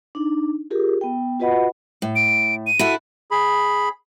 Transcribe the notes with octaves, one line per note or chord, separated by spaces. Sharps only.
D4 D#4
F4 G4 G#4 A#4
B3 G5
F4 F#4 B4 D#5 F#5 B5
A2
D7
D#7
E4 F#4 A4
G#4 B5